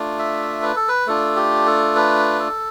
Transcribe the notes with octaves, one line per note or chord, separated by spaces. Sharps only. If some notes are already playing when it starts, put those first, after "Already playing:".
Already playing: A3 D4 F4
E5
B4
A4
B4
A3 D4 F4 A4
G4
A4
B4
A4